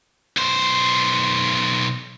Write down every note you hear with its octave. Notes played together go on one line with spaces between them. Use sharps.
B1 C5